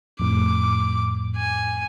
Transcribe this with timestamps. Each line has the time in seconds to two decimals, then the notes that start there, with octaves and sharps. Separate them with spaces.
0.19 F2 A2 D6
1.36 G#5